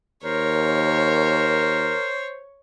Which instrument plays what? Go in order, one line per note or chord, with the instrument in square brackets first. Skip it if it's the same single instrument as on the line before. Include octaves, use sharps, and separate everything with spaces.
[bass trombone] D#2 [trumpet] A#4 [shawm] C5 [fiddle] C#5